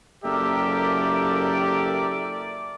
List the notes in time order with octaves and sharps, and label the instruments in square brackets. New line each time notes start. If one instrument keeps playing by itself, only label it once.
[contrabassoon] F#1 [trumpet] G4 [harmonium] A4 A#4 E5 [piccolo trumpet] D5